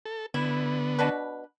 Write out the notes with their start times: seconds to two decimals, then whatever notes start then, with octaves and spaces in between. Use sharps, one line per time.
0.06 A4
0.34 D3 B3 E4
0.99 B2 D4 B4